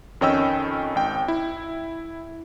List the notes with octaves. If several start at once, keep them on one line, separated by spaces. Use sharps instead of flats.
F2 D#3 C#4 D#5 G5 E6
G#1 G5
E4